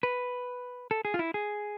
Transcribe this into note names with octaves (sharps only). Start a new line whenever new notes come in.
B4
A4
G#4
F4
E4
G#4